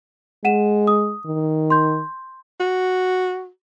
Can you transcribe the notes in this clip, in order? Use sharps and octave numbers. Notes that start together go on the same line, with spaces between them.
G#3 F#5 D#7 E7
D#6
D#3
C6 G6
F#4